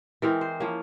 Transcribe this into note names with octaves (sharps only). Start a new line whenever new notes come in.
E3 G#3 C4 A#4
C5
F3 A#3 C#4